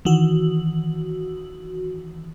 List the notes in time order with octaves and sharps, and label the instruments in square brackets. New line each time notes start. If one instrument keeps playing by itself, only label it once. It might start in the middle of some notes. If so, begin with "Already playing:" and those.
[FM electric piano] D#3 E3 F#4